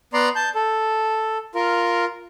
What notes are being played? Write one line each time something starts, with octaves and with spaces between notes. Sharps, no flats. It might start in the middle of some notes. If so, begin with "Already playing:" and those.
B3 D5 A#5 C6
A5 G6
A4
F4 A#4